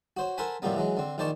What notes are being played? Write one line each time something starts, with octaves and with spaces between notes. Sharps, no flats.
F#4 C5 C#5
A4 A#4 C5 F#5 G#5 B5
A2 C3 F3 G3 A#3 B3
E3 F#3 G#3
D3 C4
A#1 D#3 C5 D5 A5 C#6